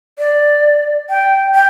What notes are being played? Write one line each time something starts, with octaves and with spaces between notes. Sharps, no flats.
D5
G5
G5